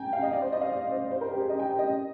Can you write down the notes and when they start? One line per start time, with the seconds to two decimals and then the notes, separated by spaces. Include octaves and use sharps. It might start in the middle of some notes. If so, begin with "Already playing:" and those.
Already playing: G5 G#5 A#5
0.13 F5
0.22 D#5
0.33 D5
0.42 C5
0.52 D#5
0.61 F5
0.72 D5
0.91 C5
1.11 C5
1.21 A#4
1.31 G4
1.40 G#4
1.49 D#5
1.60 G5
1.79 D#5